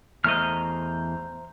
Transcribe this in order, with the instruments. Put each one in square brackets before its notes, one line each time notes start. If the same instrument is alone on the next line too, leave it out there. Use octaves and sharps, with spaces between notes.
[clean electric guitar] E2 A3 D#5 [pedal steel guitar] C5 A#5 F6